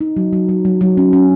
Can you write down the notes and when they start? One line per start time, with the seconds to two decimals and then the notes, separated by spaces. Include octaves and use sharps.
0.01 D#4
0.16 F#3
0.33 F#3
0.49 F#3
0.65 F#3
0.81 F#3
0.97 C#4
1.13 C#4